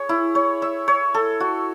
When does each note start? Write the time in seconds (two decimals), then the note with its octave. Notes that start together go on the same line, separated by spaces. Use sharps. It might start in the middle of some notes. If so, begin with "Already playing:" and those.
Already playing: G#4 C#5
0.09 E4
0.35 C#5
0.62 E5
0.88 C#5
1.14 A4
1.40 F#4